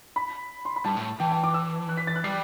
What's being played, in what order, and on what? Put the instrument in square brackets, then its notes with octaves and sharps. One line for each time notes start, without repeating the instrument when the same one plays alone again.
[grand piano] B5
C6
B5
[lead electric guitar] G2 [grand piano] A5
[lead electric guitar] A2
[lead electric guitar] E3 [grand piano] G5
[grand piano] G5
D6
E6
F#6
B6
A6
F#6
[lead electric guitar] G3 [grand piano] C7